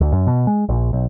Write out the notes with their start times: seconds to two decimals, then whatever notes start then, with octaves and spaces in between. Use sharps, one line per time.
0.01 D2
0.12 F#2
0.27 B2
0.47 G#3
0.69 A#1
0.93 B1